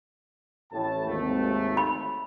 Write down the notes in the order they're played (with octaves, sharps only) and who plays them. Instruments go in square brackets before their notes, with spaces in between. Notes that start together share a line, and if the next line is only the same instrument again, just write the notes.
[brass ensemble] A1 A2 A5
G#1 D#2 A3
[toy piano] B5